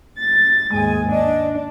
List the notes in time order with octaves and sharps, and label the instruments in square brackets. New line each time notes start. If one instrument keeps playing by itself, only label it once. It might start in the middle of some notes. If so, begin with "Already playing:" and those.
[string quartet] A6
[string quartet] D#2 G#2 G#5 [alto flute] G#3
[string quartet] D4 [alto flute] D#5